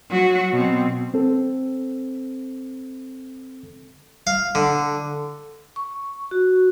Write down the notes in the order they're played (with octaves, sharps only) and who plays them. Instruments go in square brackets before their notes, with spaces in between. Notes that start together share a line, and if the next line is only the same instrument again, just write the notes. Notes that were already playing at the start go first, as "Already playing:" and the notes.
[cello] F#3 F#4
B2 C4
[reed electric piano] C4 A4
[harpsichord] F5
D3
[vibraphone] C#6
F#4